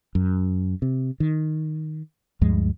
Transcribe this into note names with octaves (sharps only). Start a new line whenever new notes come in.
F#2
C3
D#3
D2 G2 F3 G#3